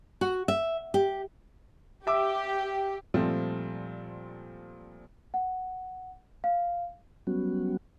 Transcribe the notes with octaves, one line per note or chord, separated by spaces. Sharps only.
F#4
E5
G4
G4 E5 D6 E6
A#2 F3 G3 A3 C4
F#5
F5
F#3 G3 B3 C#4 F#4